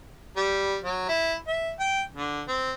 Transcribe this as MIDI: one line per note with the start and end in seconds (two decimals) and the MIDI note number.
0.37 0.77 55
0.83 1.06 54
1.09 1.34 64
1.47 1.71 76
1.80 2.02 79
2.16 2.42 50
2.48 2.73 60